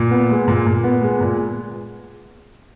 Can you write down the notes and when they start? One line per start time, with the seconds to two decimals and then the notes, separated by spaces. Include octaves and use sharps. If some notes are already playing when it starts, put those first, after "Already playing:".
Already playing: A#2
0.11 B3
0.30 G#3
0.48 A#2
0.66 A#2
0.84 B3
1.02 G#3
1.21 A#2